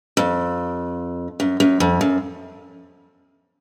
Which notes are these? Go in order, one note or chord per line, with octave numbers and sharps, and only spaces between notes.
F2
F#2
F#2
F2
F#2